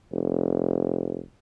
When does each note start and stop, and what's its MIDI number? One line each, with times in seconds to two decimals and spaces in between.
0.12 1.19 29